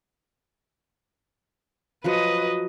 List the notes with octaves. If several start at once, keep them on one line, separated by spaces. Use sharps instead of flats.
F3 F#3 F#4 B4 D#5